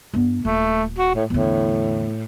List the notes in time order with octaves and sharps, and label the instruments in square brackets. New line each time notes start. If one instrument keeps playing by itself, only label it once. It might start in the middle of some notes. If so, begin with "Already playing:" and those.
[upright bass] G2 B3
[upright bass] D#1 [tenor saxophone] A3
[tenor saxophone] F#4
A2
[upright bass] E2 D3 [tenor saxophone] A2